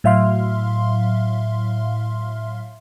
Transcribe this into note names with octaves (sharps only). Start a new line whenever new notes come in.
A2 F#3 E5 F5 C6 F6